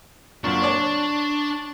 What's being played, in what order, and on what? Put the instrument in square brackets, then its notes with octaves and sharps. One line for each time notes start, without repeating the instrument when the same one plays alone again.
[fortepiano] F#2 A#2 [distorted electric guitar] D4 [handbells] C#6
[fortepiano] C#5 D5 A5